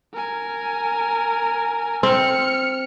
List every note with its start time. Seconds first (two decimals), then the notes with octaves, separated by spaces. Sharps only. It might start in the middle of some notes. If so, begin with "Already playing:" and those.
0.13 A#4 G#5
2.03 C4 F6 C#7